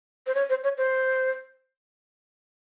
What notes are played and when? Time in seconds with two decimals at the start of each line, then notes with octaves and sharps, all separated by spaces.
0.27 C5
0.35 C#5
0.50 C5
0.64 C#5
0.78 C5